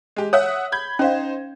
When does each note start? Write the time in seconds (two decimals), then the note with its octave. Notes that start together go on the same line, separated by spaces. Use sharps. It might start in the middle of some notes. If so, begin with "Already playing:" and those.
0.16 G#3 G4
0.33 C#5 E5 F#5 D#6
0.72 B5 G6 G#6
0.99 C#4 D#4 C5 F5